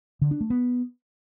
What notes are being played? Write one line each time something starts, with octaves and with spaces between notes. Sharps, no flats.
D3
D4
A3
B3